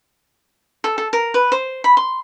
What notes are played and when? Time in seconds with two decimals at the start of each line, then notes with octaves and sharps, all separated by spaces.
0.84 A4
0.98 A4
1.13 A#4
1.34 B4
1.52 C5
1.84 B5
1.97 C6